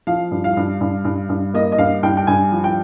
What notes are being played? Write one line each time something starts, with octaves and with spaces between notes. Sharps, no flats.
F3 F5
G2
F5
G2
G2
G2
G2
A#3 D#5
D#5
G2 F5
G2 G5
G5
G2 G#5
F3
G5